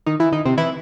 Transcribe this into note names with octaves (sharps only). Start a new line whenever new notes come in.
D#3 D#4
E3 E4
D#3 D#4
C3 C4
E3 E4